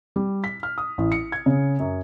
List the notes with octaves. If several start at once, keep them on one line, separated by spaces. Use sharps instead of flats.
G3
B6
F6
D#6
A1
C#7
G#6
C#3
F#2